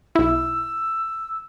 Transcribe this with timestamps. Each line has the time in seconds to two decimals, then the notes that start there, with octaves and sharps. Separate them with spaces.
0.15 B1 E4 E6